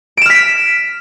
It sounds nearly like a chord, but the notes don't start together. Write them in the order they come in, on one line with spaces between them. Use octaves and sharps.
D7 E7 F6 B6